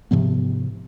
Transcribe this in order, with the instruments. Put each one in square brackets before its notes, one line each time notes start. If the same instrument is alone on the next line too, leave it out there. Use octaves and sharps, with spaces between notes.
[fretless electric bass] G#2 C3 F3 B3